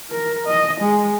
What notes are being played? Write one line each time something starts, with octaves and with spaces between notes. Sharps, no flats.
A#4
D#5
G#3